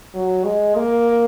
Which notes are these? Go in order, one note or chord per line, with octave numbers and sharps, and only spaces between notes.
F#3
G#3
A#3